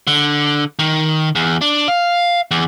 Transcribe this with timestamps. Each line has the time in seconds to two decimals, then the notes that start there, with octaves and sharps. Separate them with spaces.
0.07 D3
0.79 D#3
1.35 E2
1.61 D4
1.88 F5
2.51 E2